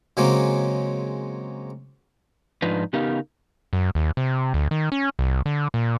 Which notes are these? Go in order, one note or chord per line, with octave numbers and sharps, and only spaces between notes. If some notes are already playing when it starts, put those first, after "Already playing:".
C#3 F#3 G#3 A#3 C4 C#4
G#2 F3 D4 D#4 F4 B4
C#3 B3 D#4 G4 A#4 F5
F#2
D#2
C3
D2
D#3
C#4
C2
D3
A#2